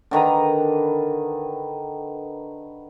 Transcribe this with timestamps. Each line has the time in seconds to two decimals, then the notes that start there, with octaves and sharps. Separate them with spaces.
0.11 D3 D#3 B4 A#5